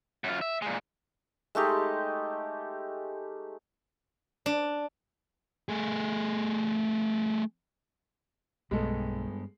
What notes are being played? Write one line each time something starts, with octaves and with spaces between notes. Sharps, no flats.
F#2 F4
E5
A#2 G#3
G#3 A3 D#4 G4
D4
A3 G#4
B1 G2 G#3 A3 B3 A4